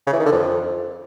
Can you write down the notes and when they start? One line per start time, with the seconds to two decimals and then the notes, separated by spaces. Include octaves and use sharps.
0.07 C#3
0.13 E3
0.19 D#3
0.26 D3
0.32 F2